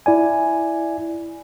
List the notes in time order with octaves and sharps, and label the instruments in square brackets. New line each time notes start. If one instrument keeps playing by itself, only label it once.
[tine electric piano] E4 D5 G#5